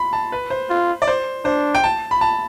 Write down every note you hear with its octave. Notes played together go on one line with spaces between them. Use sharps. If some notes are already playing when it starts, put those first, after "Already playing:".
Already playing: B5 C6
A5
B4
C5
F4
D5
C5
D4 C5
G5
A5
B5
A5